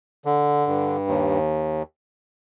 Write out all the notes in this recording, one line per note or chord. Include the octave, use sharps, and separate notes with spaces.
D3
G2
D#2